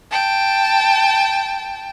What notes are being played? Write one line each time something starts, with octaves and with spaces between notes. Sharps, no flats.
G5 A5